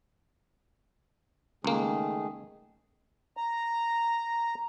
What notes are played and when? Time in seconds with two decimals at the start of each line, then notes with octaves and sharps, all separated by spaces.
1.64 C#2 D#3 A3 A#3 G#4
3.37 A#5